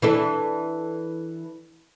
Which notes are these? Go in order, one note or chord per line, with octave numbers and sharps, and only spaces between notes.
E3 D4 A4